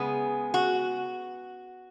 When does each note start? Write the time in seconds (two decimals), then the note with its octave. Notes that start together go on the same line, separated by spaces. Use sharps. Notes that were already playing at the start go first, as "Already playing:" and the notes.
Already playing: C#3 G#3 B3 G#4
0.54 F#4